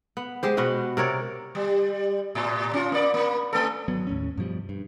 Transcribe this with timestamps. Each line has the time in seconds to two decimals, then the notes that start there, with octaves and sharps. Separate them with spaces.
0.17 B3
0.43 G#3 G4 C5
0.57 B2 B3 F#4 D#5
0.97 C3 A#4 C#5 D5
1.55 G3
2.35 A2
2.74 C#4 F4
2.92 A#3 D5
3.14 A#3
3.53 A3 A4
3.88 G#1 F#3 B3
4.07 D#2 A2 C#4
4.37 G2 B2 F3 G3
4.69 G2